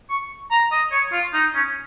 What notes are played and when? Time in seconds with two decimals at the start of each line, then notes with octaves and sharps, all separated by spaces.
0.10 C#6
0.51 A#5
0.72 D#5
0.92 C#5
1.12 F4
1.33 D#4
1.55 C#4